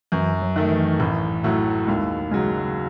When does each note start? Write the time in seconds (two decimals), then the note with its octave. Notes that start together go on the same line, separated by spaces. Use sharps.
0.12 F#2 E3
0.42 F#3
0.56 D#3 A3
0.71 E3
1.00 A1
1.44 A2 F#3 A3
1.87 D#2 G#3
2.31 C#3 F#3 G#3